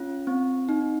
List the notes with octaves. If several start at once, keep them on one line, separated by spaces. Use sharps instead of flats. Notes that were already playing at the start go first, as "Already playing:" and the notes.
Already playing: C#4 F4
C4
D#4